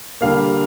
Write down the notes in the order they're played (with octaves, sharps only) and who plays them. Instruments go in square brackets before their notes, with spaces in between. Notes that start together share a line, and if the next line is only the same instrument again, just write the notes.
[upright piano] D3 G3 A#3 F5